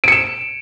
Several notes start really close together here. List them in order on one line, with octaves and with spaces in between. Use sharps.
D7 C#7 E7